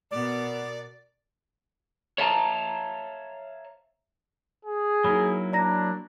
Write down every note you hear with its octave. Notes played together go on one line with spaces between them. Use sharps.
B2 B3 A#4 D5
C#5 E5 F5 A5 A#5
G#4
F#3 A#3 D#4 E4 B5
D4 D5 A#5 A#6